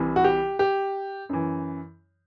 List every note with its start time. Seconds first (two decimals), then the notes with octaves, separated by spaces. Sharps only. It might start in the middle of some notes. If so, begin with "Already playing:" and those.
Already playing: C2 C3 E3
0.16 F#4
0.24 G4
0.59 G4
1.29 F#2 E3